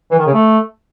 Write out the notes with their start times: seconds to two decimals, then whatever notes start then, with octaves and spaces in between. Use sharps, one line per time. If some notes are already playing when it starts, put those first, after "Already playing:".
0.11 E3
0.19 D#3
0.26 C#3
0.33 A3